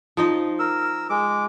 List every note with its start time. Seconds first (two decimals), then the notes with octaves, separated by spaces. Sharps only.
0.17 F3 D#4 D#5
0.59 A#4 E6
1.10 G#3 D6